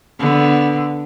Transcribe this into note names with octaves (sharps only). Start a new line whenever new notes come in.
D3 B3